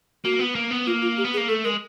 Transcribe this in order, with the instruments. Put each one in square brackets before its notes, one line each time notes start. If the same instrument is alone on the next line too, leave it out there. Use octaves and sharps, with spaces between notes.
[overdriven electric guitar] A#3 [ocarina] F#4
[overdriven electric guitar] B3
A#3
B3
[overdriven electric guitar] A#3 [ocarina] F4
[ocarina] F4
G4
[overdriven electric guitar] B3
[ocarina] G#4
[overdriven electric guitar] A#3
[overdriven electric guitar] A3 [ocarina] A4
[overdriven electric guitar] G#3 [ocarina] A#4